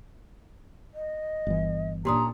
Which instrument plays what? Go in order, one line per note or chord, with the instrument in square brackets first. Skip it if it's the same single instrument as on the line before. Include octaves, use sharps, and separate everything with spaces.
[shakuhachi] D#5
[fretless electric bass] G1 E3
[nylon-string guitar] A#2 C#4 D4 [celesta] G4 C6 D#6 [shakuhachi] A#5